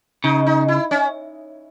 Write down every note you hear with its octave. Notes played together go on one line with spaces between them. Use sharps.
C#3 D#4
D#4
E4
C#4